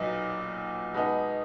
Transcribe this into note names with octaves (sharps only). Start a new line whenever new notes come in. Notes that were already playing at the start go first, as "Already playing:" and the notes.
Already playing: B1 A#2 F#3 B3 D#4
B2 G#3 B3 D#4